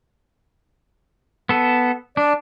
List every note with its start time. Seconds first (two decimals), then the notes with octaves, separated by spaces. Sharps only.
1.49 B3 A4
2.17 D4 D5